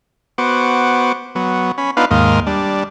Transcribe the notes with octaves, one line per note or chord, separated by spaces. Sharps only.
B3 F#4 C5 D6
F#3 B3
C#4 B5
B3 D4 D#4 F4 B4 F5
D#2 G#2 A#3 D#5 F5 C6
G3 D4